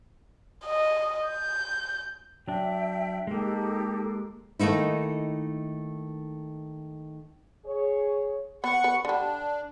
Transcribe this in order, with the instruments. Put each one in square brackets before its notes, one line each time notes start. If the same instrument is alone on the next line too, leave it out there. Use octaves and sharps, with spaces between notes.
[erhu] D#5
G6
[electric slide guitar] F#3 D4 [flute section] E5 G5
[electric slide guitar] G#3 A#3 [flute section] D#4 G4 A4
[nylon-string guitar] D#3 A3 A#3 D#4 E4
[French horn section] G#4 C#5
[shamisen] B3 [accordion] F#5 C#6
[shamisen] B3 B4
[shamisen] D3 G3 [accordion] D4